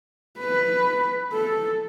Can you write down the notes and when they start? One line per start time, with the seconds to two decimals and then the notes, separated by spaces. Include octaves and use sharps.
0.39 B4
1.33 A4